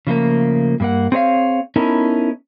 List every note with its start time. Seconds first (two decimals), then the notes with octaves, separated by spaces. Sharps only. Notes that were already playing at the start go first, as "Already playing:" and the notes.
0.07 C#3 F3 A3 A#3
0.80 G2 A#3 F#5
1.12 C4 G#4 C#5 D#5 F5
1.76 B3 C#4 D#4 E4 A4 A#4